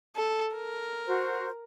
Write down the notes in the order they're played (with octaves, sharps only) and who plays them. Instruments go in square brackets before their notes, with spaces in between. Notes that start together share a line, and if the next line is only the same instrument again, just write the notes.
[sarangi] A4
A#4
[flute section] F#4 C5